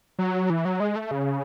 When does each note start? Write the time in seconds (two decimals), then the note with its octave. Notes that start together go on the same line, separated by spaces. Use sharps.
0.19 F#3
0.50 E3
0.65 F#3
0.80 G#3
0.96 A3
1.11 C#3